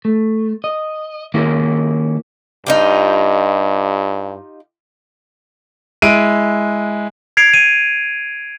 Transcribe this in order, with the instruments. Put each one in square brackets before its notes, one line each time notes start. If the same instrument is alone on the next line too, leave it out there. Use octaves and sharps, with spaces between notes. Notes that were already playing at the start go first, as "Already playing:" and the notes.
[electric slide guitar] A3
D#5
D#3 A#3 C#4 E4
[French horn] G2 [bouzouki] D#4 F4 G4
[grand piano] G#3 E4 D7 D#7
[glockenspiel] G#6 C7 D7 F7
D#7